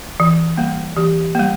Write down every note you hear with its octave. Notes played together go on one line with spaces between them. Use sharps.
E3
G3 A#3
E3 G4
G3 A#3